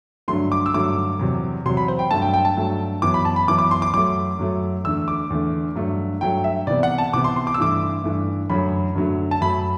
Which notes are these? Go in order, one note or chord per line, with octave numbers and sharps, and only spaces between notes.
G2 D3 F#3 A3 C6
D6
E6
G2 D3 F#3 A3 D6
E2 C3 F#3
E2 C3 F#3 C6
B5
C5
G5
G2 F#3 A3 A5
G5
G5
A5
G2 F#3 A3
F#2 E3 B3 D6
B5
A5
B5
F#2 E3 B3 D6
D6
C6
D6
F#2 F#3 A3 D6
F#2 F#3 A3
E2 D3 A3 E6
D6
E2 D3 A3
G2 F#3 A3
G2 F#3 A3 G5
E5
C3 E3 B3 D5
F#5
A5
C3 E3 B3 D6
C6
C6
D6
E6
G2 E3 A3 D6
G2 E3 A3
F#2 D3 F#3 A3 B5
F#2 D3 F#3 A3
A5
F#2 F#3 A3 B5